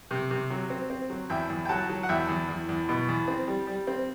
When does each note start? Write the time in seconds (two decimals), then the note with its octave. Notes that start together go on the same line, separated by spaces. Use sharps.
0.11 C3
0.31 C3
0.50 F#3
0.70 C4
0.90 C4
1.10 F#3
1.30 E2 E5 G5
1.50 E2
1.65 G5
1.69 F#3 F#5 A5
1.89 F#3
2.03 F#5
2.09 E2 E5 G5
2.28 E2
2.49 E2
2.69 E2
2.89 B2
3.08 E2
3.28 C4
3.48 G3
3.67 G3
3.87 C4